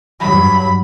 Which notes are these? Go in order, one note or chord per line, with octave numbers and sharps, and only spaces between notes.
G2 F#3 B5